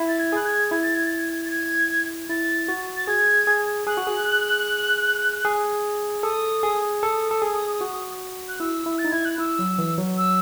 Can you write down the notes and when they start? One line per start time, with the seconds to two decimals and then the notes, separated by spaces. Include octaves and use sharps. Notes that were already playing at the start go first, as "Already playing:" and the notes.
Already playing: E4
0.08 A6
0.19 G#6
0.32 G#4 F#6
0.46 G#6
0.71 E4 G#6
0.83 A6
0.95 G#6
1.06 A6
1.18 G#6
1.46 A6
1.50 G#6
2.29 E4 A6
2.68 F#4
2.96 A6
3.07 G#4 G#6
3.47 G#4
3.87 G#4 F#6
3.97 F#4
4.07 G#4
5.45 G#4
6.23 A4 D#6
6.63 G#4
7.02 A4 D#6
7.31 A4
7.42 G#4
7.81 F#4
8.48 F#6
8.60 E4 E6
8.86 E4
8.99 A6
9.04 D#4
9.12 E4 G#6
9.25 F#6
9.38 E4 E6
9.59 F#3
9.78 E3
9.98 F#3
10.18 E6